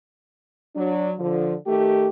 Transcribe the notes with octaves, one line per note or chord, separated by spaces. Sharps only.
F#3 D4
D3 F3
D#3 A3 G4